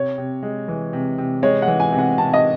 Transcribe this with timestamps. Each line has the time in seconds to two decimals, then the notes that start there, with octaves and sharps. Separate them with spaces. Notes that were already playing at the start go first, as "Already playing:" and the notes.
Already playing: C3 C#5
0.18 C3
0.43 G#3
0.68 E3
0.93 C3
1.18 C3
1.43 G#3 C#5
1.62 F#5
1.68 E3
1.80 G#5
1.92 C3
1.98 F#5
2.18 C3 A5
2.34 D#5